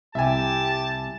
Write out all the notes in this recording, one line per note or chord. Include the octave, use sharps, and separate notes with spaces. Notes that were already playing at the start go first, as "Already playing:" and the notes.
C2 G4 E5 G#5 A5